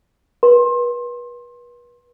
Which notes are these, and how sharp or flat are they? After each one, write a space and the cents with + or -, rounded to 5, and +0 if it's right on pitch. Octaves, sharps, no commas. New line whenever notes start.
B4 -35 C6 +25